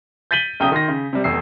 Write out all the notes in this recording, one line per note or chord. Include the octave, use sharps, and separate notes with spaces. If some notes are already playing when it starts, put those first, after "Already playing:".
G6 A6 B6 D#7 F#7 G7
B1 C#3 G5 A#5 D#6 G7
D#3 C6 A#6
C#3
C3 G3
F1 E2 E6 C7